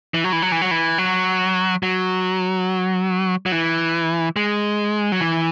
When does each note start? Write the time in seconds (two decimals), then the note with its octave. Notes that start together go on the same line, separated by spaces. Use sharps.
0.14 E3
0.24 F#3
0.32 E3
0.42 F#3
0.52 E3
0.62 F#3
0.71 E3
0.98 F#3
1.83 F#3
3.46 F#3
3.52 E3
4.36 G#3
5.12 F#3
5.21 E3